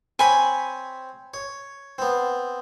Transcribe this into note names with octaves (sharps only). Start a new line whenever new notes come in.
C4 C#5 G#5 B5
C#5
B3 C4